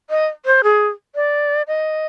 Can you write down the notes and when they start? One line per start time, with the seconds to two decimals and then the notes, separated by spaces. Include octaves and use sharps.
0.10 D#5
0.46 C5
0.64 G#4
1.15 D5
1.68 D#5